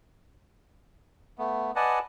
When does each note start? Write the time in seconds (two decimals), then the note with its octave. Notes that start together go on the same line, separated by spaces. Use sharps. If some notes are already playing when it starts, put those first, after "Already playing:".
1.39 A3 B3
1.76 B4 D5 D#5 F#5 G#5 A5